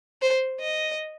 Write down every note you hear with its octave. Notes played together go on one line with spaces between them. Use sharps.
C5
D#5